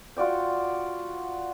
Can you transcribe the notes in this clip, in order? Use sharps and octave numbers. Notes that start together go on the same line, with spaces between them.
F4 F#4 D5 G5